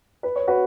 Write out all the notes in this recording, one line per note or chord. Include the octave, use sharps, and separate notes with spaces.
B4
C#5
F#4 B4